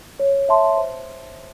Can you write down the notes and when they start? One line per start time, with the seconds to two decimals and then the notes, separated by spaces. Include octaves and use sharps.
0.20 C#5
0.49 E5 A5 C6
0.77 C5